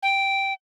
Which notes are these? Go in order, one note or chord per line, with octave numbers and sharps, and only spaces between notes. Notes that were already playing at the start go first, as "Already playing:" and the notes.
G5